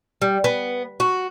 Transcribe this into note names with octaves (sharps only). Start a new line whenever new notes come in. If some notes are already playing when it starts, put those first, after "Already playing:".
G3
B3
F#4